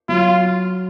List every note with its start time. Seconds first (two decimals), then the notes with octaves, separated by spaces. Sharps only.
0.09 F#3 F4